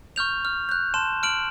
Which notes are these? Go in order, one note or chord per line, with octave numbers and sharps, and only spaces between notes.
C#6 F6 G6 F7
F6
F#6 G6
A5 C6 E7
F6 D7 F#7